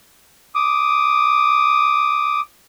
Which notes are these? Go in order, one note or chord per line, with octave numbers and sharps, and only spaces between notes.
D6 D#6